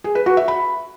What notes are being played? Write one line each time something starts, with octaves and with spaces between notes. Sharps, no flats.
G#4
B4
F#4
E5
B5